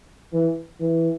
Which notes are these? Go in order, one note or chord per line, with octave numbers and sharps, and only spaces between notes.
E3
E3